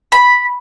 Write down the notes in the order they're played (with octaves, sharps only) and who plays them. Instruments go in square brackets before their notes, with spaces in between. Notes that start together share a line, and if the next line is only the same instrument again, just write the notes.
[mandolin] B5